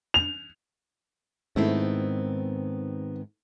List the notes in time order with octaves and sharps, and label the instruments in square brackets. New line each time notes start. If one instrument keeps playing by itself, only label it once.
[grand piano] F7
[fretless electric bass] G#2 [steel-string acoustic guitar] D#3 B3 C4 [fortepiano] A3 E4